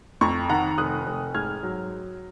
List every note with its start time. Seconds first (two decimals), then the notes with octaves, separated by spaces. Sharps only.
0.21 F2 A#5 C#6
0.49 D#3 F#5 A#5
0.78 F1 D#6 F#6
1.07 F1
1.35 G#2 F6 G#6
1.63 F#3